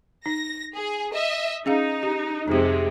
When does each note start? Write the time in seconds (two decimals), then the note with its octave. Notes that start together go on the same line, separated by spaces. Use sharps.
0.26 D#4 A#6
0.75 G#4
1.14 D#5 E5
1.66 C#4 D#4 G#4 F5
2.03 G4
2.48 F2 C3 G#3 D#4 G4